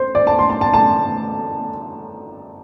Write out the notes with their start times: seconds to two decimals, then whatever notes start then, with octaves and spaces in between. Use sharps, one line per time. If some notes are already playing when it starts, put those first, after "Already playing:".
Already playing: C5
0.15 D5
0.27 A5
0.39 C6
0.50 A5
0.61 A5
0.74 A5